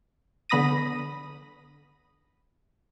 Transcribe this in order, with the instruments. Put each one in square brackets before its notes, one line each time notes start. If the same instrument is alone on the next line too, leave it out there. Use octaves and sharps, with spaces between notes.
[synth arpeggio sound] D3 B3 B5 D#6 A#6 D#7